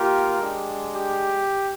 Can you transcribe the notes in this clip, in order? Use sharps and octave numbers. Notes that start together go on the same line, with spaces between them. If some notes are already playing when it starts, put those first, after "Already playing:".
Already playing: A#3 F4 G4 A#4
G#3 D4 G4
G4